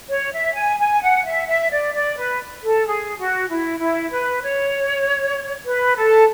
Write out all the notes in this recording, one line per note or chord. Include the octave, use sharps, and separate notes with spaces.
C#5
E5
G#5
G#5
F#5
E5
E5
D5
D5
B4
A4
G#4
F#4
E4
E4
B4
C#5
B4
A4